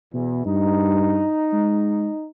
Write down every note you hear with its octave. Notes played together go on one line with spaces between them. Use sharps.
E2 B2
G2 D#4
G#3